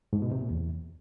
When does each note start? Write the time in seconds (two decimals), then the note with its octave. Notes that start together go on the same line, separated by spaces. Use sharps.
0.13 G#2
0.22 B2
0.32 C3
0.41 A#2
0.50 E2